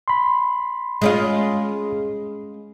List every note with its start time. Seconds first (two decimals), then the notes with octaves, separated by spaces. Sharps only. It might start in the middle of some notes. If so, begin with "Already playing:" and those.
0.08 B5 C6
1.02 G#3 C#4 F4